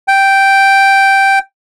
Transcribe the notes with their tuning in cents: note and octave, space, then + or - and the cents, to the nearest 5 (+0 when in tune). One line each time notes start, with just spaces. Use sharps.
G5 -5